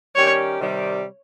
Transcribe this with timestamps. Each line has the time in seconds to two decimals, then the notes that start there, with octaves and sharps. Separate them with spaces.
0.15 D#3 G3 C#4 G4 A#4 C#5
0.60 C3 D#3 G3